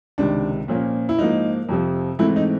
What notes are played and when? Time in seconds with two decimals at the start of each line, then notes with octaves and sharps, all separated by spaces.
0.18 C#2 C3 D#3 D4
0.68 A#2 F3 A#3 C#4
1.09 E4
1.18 G#2 F3 A#3 D#4
1.69 F2 C3 F3
2.19 G#2 E3 A3 C4 E4
2.36 D#4